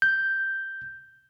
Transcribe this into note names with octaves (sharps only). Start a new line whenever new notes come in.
G6